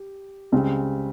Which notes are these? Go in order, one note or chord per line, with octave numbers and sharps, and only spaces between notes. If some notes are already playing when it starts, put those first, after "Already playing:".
Already playing: G4
C#2 C#3 G3 C4